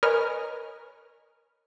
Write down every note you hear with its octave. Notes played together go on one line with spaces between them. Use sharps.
A#4 B4 C#5 D#5 G#5 F6